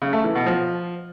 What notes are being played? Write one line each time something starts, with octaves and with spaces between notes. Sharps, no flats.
C#3
A3
E3
B2
F3